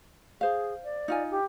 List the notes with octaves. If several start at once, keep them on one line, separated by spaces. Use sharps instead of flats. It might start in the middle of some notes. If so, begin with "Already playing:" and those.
G#4 C5 F5
D5
D#4 F4 G#5
G4